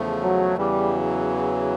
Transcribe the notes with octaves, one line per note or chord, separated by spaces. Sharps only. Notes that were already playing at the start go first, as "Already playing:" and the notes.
Already playing: E2 C#3 F3 A3
F#3
E2 C#3 E3 G3
F#3